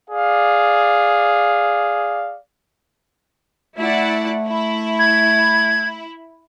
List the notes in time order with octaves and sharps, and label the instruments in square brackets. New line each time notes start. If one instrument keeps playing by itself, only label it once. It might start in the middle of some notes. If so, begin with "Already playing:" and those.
[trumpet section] G#4 D5 F5
[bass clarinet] A3 [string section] E4 D5 F#5
[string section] E4
[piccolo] G#6